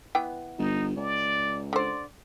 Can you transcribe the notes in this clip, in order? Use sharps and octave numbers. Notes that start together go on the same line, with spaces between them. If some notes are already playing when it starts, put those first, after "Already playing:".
E3 B3 G5
G1 D#4
C#2 D5
D3 C5 D5